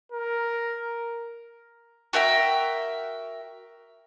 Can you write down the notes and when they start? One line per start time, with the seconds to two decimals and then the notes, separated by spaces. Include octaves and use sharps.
0.12 A#4
2.13 F#4 A#4 E5 G5